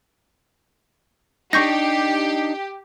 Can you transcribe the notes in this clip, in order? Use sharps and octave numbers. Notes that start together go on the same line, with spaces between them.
D4 D#4 G4 C#6 G6 A#6